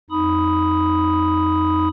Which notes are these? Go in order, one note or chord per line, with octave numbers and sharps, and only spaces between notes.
F2 D#4 B5 D#6